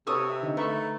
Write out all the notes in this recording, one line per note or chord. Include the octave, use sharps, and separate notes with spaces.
C3 F#4 A4 B4 C#5 C#6 D#6 E6
E5
D3 D#4
A3 A#4 B4 E5 C#6